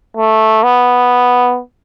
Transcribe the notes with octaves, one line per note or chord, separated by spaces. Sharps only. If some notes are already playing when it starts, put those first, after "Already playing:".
A3
B3